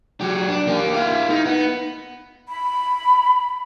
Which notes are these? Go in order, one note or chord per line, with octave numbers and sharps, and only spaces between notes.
F#3 G4
D4
A#3 G4
E4 F5
D#4
B3
B5